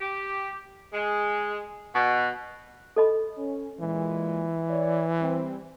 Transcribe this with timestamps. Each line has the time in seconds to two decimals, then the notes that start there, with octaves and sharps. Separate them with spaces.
0.01 G4
0.93 G#3
1.94 B2
2.96 A4 D#5 B5
3.38 C#4
3.80 A#2 E3 G#3
4.70 C#5 D5
5.21 G3 C4